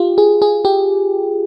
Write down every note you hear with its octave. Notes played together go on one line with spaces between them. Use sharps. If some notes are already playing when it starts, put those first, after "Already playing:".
Already playing: F4 G4
G#4
G#4
G4